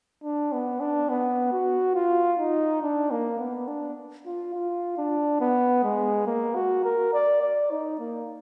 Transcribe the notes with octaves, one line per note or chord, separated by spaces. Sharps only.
D4
B3
D4
B3
F#4
F4
D#4
D4
A#3
B3
D4
F4
F4
D4
B3
G#3
A#3
F#4
A#4
D5
D5
D#4
A#3